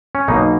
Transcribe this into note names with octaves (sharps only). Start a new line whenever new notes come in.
C#4
B1 B2 A#3 D#4